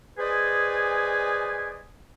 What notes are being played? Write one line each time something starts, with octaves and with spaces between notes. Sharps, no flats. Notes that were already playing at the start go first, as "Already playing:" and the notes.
G#4 B4 C5 D5 D#5 G#5